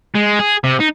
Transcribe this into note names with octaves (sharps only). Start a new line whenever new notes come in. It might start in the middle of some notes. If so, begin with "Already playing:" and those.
G#3
G#4
C3
D#4